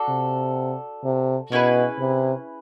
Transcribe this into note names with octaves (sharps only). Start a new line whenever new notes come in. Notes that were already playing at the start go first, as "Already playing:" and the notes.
Already playing: D4 F#4 A4
C3
C3
B2 C#4 E4 G#4 B4
C3